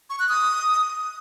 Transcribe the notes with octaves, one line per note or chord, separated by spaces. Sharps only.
C#6
F#6
D#6